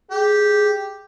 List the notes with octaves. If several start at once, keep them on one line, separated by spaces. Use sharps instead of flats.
G4 G#4